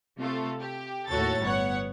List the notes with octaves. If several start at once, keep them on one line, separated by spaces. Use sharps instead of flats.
C3 A3 F4 A4
G4
D#2 A2 F#4 A4 C#5 A6
G1 B3 C#5 F#5